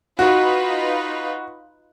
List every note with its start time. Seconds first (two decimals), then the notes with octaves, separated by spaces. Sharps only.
0.19 D#4 F4 F#4 B4